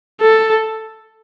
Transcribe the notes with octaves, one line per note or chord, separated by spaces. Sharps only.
A4